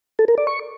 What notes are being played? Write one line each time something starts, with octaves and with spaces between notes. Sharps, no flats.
A4
A#4
D5
C#6